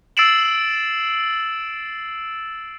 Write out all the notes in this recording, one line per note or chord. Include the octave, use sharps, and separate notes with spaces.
E6 A6 C7 D7 E7 F#7